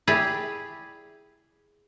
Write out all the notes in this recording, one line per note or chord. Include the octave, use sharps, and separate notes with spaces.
E4 G4 G#4 D5